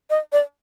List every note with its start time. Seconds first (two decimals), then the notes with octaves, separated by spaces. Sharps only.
0.10 D#5
0.32 D5